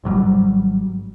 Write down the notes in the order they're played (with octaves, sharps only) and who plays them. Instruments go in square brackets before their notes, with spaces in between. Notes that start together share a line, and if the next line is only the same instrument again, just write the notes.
[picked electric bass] G#1 G#2 F#3 G3